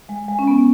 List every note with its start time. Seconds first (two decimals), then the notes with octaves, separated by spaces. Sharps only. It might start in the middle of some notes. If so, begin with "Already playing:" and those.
0.09 G#3
0.28 G#3
0.39 C#4
0.48 B3